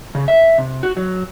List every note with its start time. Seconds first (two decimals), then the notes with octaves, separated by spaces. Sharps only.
0.15 C#3
0.28 E5
0.58 C3
0.83 F#4
0.97 F#3